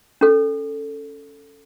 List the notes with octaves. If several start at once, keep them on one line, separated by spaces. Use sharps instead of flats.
C#4 A4